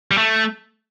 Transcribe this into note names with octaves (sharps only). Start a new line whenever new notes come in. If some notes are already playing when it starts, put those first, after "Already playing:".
G3
A3